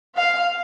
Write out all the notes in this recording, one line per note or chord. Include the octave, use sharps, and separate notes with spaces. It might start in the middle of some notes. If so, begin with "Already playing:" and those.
F5